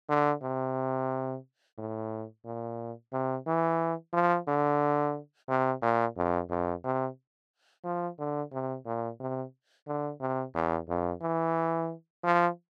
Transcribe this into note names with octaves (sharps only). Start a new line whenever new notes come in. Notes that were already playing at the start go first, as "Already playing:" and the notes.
D3
C3
A2
A#2
C3
E3
F3
D3
C3
A#2
F2
F2
C3
F3
D3
C3
A#2
C3
D3
C3
E2
F2
E3
F3